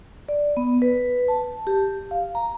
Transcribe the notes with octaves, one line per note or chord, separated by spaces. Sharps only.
D5
B3
B4
A5
G4
F5
A#5